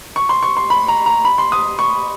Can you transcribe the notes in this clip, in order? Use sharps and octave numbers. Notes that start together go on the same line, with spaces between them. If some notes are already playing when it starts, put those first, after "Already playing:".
C#6
C6
C#6
C6
B5
A#5
A#5
B5
C6
D#6
C#6